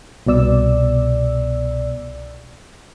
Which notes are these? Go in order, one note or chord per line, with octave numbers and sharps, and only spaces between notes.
C2 B2 D5 E6